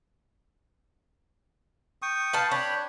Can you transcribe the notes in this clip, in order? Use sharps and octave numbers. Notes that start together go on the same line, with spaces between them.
G5 C#6 D#6
B4 F5 A5
D4 C#5 G5 B5